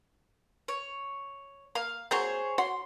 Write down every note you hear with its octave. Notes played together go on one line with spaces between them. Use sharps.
C#5
A#3 F5
F#3 A#3 C4 G#4 C5 C#5
F#4 C#5 F#5 C6